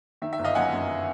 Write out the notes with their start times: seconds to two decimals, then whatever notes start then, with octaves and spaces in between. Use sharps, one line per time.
0.22 D#3 E5
0.33 E5
0.39 G1
0.44 D#5 F5
0.55 F#2 F#5 G#5
0.73 F#2